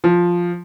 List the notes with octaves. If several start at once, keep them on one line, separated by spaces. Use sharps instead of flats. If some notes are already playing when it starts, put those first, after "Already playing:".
F3